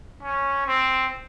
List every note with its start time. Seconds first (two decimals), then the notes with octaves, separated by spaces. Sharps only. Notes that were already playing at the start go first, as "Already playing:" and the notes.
0.22 C#4
0.67 C4